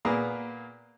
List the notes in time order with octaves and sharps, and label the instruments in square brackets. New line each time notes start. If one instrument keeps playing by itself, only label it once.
[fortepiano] A#2 A#3 B3 G#4 A#5